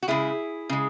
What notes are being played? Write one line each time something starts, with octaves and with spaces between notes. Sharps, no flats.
F#4
C#3 G#3 E4 G#4
C#3 G#3